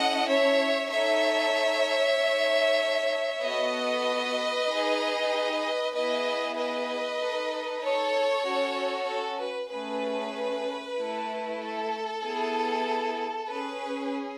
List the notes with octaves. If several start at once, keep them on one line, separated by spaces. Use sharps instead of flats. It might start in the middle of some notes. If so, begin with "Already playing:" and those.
Already playing: C#4 E4 A4 D#5 F#5
C#5 E5
D#4 A4 C#5 E5
D#4 A4
B3 F#4 A4 B4 D#5
D#4
G#4
B3 E4 G#4 B4 D#5
B4 D#5
D#4 A4
A4 C#5
C#4 F#4 A4
A4
B4
A3 C#4 G#4 B4
A3 E4 A4
A4
B3 E4 G#4
C#4 G#4 B4